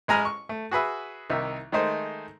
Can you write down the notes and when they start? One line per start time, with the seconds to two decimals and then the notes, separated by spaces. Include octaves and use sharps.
0.08 A1 G#3 G#5 A#5 B5 F6
0.25 C#6
0.49 A3
0.71 F#4 G#4 B4 E5
1.30 C2 D#3 D#4 E5
1.72 D#3 G#3 A3 D#4 C5